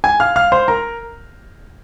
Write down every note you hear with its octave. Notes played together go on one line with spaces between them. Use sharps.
G#5 G#6
F5 F6
F5 F6
C5 C6
A#4 A#5